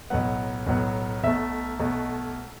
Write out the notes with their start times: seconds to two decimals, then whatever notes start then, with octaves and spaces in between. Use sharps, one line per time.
0.10 B1 A2 F#3 B3 F#5
0.67 B1 A2 F#3 B3
1.24 B1 B2 A3 E5
1.79 B1 B2 A3